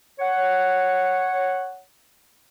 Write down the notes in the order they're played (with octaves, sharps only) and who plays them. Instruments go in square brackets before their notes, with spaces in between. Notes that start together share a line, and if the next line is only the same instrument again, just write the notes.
[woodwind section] C#5 F#5